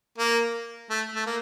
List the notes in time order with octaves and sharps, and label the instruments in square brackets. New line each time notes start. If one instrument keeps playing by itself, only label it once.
[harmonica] A#3
A3
A3
A#3